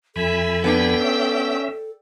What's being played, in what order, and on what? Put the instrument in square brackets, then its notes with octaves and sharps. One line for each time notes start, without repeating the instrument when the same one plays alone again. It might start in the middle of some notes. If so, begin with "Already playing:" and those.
[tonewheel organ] F2 G#5 B5 [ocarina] A4 [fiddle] E5
[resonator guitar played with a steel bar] B3 D4 [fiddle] D5 G5
[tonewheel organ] C#4 E5